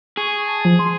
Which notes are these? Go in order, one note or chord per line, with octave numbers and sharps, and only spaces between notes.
G#4 C#6
A5
F3
C6